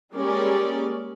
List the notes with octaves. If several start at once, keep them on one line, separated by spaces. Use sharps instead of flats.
G3 G#3 A#3 C#4 A#4 D5